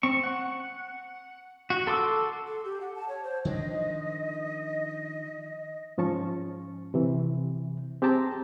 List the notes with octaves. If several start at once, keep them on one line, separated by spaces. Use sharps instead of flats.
C4 C#6
F#5
F#4
A4 C6 D6 E6
A4
G4
F#5
A5
C#5
C5
D#3 F3 D4 D#5
G#2 F3 C#4 A5 C#6
C3 E3
C4 G4 G#4 G5 A5 A#5